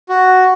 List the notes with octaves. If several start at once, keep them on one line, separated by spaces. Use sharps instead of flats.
F#4